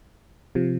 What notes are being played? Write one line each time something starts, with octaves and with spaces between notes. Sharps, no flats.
C3 F3